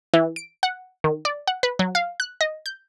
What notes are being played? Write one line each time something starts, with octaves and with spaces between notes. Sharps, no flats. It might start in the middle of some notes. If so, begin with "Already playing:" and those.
E3
D7
F#5
D#3
D5
F#5
B4
F#3
F5
F#6
D#5
G6